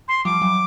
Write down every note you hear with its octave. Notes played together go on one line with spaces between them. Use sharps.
C6
F3 G3 D6
E3 F#3